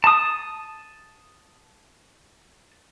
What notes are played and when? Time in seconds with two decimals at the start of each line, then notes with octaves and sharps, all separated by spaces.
0.04 A5 D#6